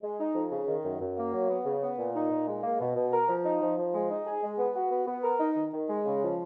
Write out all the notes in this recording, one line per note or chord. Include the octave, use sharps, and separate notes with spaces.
G#3
D#4
F2
C#3
D#3
F#2
F#2
A#3
F#3
B3
C#3
B3
A#2
D#4
A#2
G#3
A#3
B2
B2
A#4
F3
D#4
F3
F3
G#3
D#4
G#4
G#3
B3
F#4
B3
B3
A#4
D#4
D#3
D#3
G#3
C#3
F3